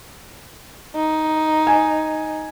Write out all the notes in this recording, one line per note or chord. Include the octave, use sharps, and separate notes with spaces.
D#4
G#5